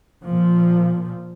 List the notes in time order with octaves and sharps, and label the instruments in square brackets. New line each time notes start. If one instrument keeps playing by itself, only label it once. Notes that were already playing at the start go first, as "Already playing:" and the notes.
[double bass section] A#2 F3